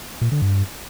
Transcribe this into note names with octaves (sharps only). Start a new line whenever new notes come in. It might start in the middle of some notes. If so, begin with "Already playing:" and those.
A#2
D3
G2